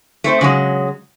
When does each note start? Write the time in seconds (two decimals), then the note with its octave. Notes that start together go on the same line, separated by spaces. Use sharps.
0.24 A3 C4 C5
0.41 C#3 F#3 G#3